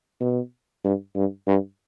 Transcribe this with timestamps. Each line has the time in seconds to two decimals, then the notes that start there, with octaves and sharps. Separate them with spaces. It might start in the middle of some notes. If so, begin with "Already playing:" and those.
0.21 B2
0.84 G2
1.16 G2
1.47 G2